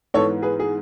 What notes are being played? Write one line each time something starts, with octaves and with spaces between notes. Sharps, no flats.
G#2 E3 B3 A4 C#5
G#4 B4
G#4